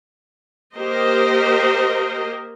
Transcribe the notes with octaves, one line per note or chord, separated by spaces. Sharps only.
A#3 G4 A#4 C5 D#5